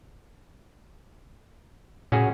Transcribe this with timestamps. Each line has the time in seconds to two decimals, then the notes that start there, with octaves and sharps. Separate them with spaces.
2.12 A#2 C#4 F#4 G#4